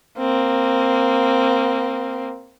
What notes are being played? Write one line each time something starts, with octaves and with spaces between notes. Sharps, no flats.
A#3 C4